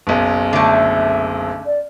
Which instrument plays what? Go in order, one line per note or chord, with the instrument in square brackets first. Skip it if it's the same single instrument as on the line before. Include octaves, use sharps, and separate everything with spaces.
[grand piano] F#1 B1
[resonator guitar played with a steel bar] D3 A3 [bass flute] E5
[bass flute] D5